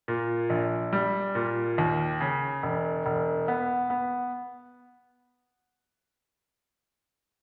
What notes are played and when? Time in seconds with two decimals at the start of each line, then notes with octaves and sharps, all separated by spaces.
0.08 A#2
0.50 A#1
0.93 G3
1.35 A#2
1.78 D#2
2.20 C#3
2.63 E1
3.06 E1
3.48 B3
3.90 B3